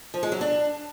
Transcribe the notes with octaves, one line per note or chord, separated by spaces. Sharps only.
F3
G#3
F#3
D4